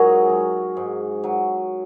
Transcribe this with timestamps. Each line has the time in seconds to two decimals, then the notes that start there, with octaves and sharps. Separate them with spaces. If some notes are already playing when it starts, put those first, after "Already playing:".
Already playing: G#2 F#3 F#4 G#4 A#4
0.30 F#3
0.77 G#2
1.24 F#3